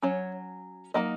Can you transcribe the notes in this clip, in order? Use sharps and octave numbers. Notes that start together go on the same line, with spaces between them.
F#3 C#4 C#5
F#3 A#3 D#4 D#5